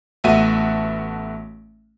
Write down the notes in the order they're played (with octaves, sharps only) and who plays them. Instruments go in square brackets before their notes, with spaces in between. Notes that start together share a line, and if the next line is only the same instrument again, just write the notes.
[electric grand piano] A1 A3 B3 F#4 E5 D#7